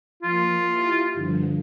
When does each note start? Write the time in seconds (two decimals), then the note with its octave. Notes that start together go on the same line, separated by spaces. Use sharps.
0.23 F3 A#3 F4
0.70 E4 G4
1.14 G2 D3 F3